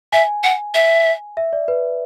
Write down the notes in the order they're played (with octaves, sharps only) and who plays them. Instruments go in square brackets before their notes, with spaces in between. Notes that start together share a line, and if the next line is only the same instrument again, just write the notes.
[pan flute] E5 [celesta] G#5
[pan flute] F#5
E5
[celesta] E5
D5
B4